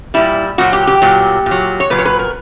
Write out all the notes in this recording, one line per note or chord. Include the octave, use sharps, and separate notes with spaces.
A#2 G3 E4
A#2 F#3 F#4
G4
G4
A#2 F#3
A#2
F#3
C#5
A#2 F#3 B4
C#5
B4
A#4